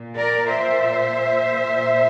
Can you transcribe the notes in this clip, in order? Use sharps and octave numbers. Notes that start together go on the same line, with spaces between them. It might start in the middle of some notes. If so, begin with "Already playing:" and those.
Already playing: A#2
A#4 D5
C5 E5
A#2